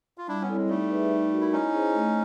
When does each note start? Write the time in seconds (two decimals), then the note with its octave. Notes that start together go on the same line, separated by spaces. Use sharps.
0.18 F4
0.28 G3 D4 E4
0.42 B3 C#4
0.49 G3 C4 E4 A4 C#5
0.56 G#3
0.69 G3 A3 D#4
0.90 G#4 B4 E5
1.11 D#4
1.32 F#4 A#4
1.41 E4
1.52 C#4 D#4 E4
1.73 G#4 C5
1.94 A3